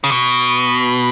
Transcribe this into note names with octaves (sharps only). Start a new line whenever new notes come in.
C#3
B2